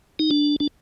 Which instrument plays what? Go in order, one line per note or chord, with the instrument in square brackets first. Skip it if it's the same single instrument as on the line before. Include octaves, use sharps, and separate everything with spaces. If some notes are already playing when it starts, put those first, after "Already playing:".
[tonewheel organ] D#4
D4
D4